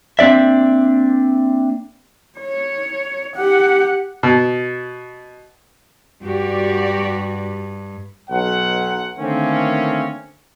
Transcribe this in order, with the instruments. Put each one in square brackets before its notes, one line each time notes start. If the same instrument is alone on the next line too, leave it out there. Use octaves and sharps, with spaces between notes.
[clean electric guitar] A#3 C4 D4 D5 E5
[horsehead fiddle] C#5
G4 F#5
[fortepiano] B2
[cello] G2 [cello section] F#4 G4 D5
[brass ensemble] B1 F#5
D3 D#3 A3 A#3 C4 C#4